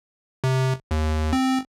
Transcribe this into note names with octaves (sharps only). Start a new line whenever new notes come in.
C3
D#2
C4